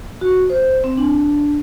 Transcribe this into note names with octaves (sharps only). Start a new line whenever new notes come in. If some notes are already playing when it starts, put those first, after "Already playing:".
F#4
C5
C4
D4